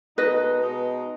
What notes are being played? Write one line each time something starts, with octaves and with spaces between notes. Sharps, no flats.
B2 G#3 D#4 B4 D#5
B2 G#3 D#4